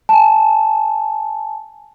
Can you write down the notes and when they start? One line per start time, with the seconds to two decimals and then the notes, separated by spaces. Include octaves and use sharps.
0.09 G#5 A5